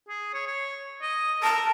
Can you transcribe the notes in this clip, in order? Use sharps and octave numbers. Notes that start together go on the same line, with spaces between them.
G#4
C#5
C#5
D#5
A#4 A5